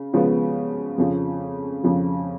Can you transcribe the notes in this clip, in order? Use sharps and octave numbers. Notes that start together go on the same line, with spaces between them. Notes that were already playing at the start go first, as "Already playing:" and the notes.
Already playing: C#3
C#3 F3 G#3 B3
F2 C#3 F3
F2 C#3 F3